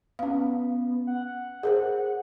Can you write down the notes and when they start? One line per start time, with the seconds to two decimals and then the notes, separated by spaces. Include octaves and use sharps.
0.19 B3 C#4 F5
1.07 F#5
1.63 G#4 A#4 C5